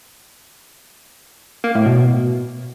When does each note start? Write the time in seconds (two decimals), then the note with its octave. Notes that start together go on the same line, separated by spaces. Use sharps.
1.64 A#3
1.75 A2
1.86 B2